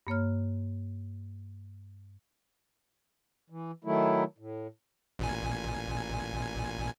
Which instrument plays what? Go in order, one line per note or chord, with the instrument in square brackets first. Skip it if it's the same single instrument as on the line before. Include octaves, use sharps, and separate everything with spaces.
[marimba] G2 A#3 C#5 F6
[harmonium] E3
D#3 F#3 A3 E4
A2
[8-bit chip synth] A1 A#2 G#5